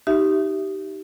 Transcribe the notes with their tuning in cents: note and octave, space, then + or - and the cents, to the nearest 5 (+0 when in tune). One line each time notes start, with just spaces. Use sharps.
D#4 +0 G4 -25 E5 +5